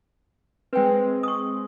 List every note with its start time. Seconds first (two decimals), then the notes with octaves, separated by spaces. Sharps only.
0.73 G#3 C4 B4 G5
1.23 C#6 D#6